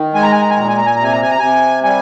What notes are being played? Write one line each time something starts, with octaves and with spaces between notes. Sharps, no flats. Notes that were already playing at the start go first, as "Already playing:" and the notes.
Already playing: D#3
G#3 G#5
A#5
G#5
A#5
G#5
A#2 A#5
G#5
A#5
G#5
A#5
C3 G#5
A#5
G#5
A#5
C3 G#5
G3 G#5